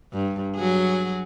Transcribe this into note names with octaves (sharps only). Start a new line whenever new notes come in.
G2
F#3 F#4 G#4